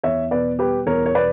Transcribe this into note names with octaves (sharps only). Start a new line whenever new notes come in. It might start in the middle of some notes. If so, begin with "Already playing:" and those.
E2 C#5 E5
B2 B4 D5
G3 G4 B4
E2 A#4 C#5
C#5
B2 B4 D5